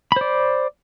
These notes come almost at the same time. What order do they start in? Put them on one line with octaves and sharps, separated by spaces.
B5 C5 D5